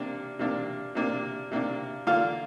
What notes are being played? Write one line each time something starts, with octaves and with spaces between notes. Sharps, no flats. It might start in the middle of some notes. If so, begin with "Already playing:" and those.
Already playing: C3 A#3 D4
C3 A#3 D4
C3 A#3 D4
C3 A#3 D4
D3 A#3 D4 F4 F5